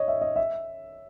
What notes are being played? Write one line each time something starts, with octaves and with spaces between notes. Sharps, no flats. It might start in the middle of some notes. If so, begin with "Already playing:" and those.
Already playing: C#5 D#5
E5
D#5
E5